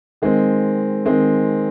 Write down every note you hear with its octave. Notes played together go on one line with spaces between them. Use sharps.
D#3 G#3 C4
D#3 G#3 C4